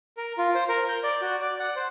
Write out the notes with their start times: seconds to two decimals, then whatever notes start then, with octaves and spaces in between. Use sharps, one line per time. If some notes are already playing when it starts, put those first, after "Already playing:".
0.17 A#4
0.38 F4
0.55 C5
0.69 A#4
0.89 G6
1.04 D5
1.21 F#4
1.42 D5
1.60 F#5
1.76 C5